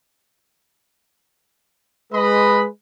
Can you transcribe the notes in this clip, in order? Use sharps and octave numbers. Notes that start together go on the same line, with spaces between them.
G#3 B4 D#5 B5